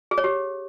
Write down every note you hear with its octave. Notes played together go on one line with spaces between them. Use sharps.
G#4
C#5
G4